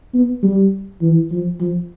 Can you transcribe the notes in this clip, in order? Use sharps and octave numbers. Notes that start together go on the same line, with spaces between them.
B3
G3
E3
F3
F3